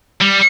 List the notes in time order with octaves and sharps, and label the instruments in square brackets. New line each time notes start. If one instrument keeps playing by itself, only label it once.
[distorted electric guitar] G3